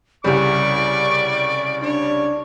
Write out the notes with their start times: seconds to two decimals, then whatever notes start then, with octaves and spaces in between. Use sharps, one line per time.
0.24 C2 C#3 G3 D5 C#6
1.83 D4 C#5